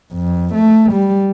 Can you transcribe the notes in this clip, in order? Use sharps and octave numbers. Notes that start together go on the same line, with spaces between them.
F2
A3
G3